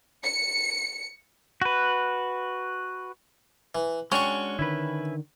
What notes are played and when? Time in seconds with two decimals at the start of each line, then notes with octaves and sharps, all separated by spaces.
0.24 C#7
1.62 F#4 B4
3.75 E3
4.12 G#3 C#4 D4 F#4 G5 C#6
4.59 D3 D#3 E4 B4